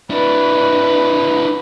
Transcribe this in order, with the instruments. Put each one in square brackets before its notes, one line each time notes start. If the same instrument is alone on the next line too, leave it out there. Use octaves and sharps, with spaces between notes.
[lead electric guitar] D4 E4 [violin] B4